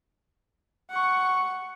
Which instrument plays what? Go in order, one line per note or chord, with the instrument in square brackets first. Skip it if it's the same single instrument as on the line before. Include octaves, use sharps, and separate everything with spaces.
[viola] F#5 C#6